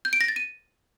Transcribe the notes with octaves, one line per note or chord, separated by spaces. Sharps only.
G6
D7
A#6
A6
D#7